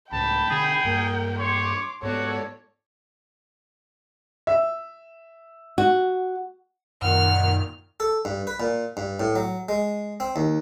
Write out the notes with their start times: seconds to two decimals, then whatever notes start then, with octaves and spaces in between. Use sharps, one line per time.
0.12 C#2 A2 G5 A5 B5
0.50 B2 D3 G#4
0.85 G2 A#3 A#4
1.39 C#5 C6 D6
2.03 G#2 B3 F#4 A4 C#5 D5
4.47 E5
5.78 F#4
7.02 F#2 A#2 D#3 F#5 F6
8.00 A4
8.25 G2
8.47 B4
8.60 A#2
8.97 G2
9.20 A2
9.36 F#3
9.69 G#3
10.20 C4
10.36 D#2